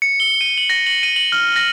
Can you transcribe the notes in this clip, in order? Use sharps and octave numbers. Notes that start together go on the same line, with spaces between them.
C#7
G7
D#7
F#7
A#6
F#7
D#7
F#7
F6
A#6